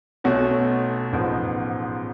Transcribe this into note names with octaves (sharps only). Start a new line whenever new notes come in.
B1 B2 A3 C#4 F#4
A1 G#2 F3 B3